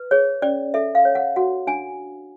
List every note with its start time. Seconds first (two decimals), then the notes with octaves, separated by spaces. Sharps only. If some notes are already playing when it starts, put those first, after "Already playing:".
Already playing: B4
0.11 G#4 C#5
0.42 C#4 D5
0.74 A4 E5
0.95 F5
1.05 C#5
1.15 F#5
1.36 F#4 F#5
1.67 D4 G#5